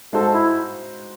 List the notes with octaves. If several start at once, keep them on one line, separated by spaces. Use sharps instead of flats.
G#3 D#4 F#4 A4 C5
E4